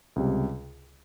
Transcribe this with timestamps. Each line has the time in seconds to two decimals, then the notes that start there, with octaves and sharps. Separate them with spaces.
0.16 C#2 C3 G3